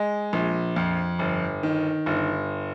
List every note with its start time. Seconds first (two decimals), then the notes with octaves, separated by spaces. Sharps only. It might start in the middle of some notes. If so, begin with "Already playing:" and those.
Already playing: G#3
0.33 A#1
0.76 F2
1.19 G1
1.63 D#3
2.06 G1